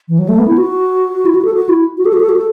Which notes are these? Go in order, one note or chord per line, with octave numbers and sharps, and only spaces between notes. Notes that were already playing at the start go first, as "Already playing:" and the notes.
E3
F#3
A3
B3
E4
F#4
E4
F#4
A4
F#4
E4
F#4
A4
F#4
A4
F#4
A4